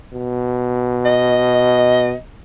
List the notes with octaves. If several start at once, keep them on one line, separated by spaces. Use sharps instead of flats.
B2
D#5